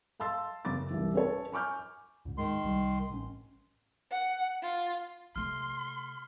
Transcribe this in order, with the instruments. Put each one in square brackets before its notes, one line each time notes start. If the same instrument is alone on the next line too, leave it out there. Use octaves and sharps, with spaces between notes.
[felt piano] F5 A5 C6 E6 A6
F#2 C#3 G#4 D6 A6
C2 E3
C#4 A#4 B4 C#5 A5
G#5 C#6 D6 F6 G6
[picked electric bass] C#2 G#2
[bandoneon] D#3 C6 [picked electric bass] G#3
[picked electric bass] C2 G3
A1 C#4
[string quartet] F#5
F4
[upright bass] C3 A3 [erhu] C6 [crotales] F6